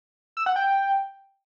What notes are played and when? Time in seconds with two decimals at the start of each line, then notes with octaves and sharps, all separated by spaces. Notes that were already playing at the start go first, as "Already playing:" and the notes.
0.37 E6
0.46 F#5
0.56 G5